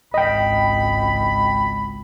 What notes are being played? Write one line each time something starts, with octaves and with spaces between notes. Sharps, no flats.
G#1 C#2 D#5 G5 B5